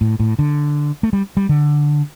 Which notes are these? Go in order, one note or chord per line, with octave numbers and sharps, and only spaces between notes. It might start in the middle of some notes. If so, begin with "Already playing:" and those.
A2
A2
D3
A3
G3
G3
D3